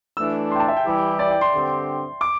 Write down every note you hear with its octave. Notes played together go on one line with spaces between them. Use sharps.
E3 A3 D4 E6
C6
G5
A5
E5
G5
E3 G3 E4 G4
D5
G5
C6
G2 D3 C4 G4
D6